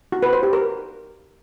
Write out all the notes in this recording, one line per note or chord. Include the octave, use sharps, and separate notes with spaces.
F#4
B4
C5
G4
A#4